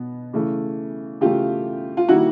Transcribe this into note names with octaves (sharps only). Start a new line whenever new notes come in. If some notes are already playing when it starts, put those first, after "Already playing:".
Already playing: B2 B3
C#3 E3 A3
C#3 E3 A3 F4 G4
F4
D#3 G3 A#3 E4 F#4